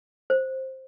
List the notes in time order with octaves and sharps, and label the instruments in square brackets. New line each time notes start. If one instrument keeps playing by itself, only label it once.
[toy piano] C5